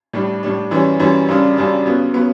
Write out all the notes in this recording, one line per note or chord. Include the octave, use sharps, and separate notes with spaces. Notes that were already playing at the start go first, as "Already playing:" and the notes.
A2 G3 D4
A2 G3 D4
F#2 E3 G3 C#4
F#2 E3 G3 C#4
F#2 C#3 G3 D4
F#2 C#3 G3 D4
C#3 F#3 B3
C#3 F#3 B3